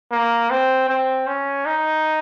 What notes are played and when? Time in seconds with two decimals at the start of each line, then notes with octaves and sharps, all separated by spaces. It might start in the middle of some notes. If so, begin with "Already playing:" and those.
0.12 A#3
0.50 C4
0.89 C4
1.27 C#4
1.66 D#4